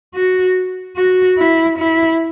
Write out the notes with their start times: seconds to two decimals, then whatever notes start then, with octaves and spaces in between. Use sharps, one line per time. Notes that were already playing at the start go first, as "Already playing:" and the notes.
0.15 F#4
0.97 F#4
1.38 E4
1.79 E4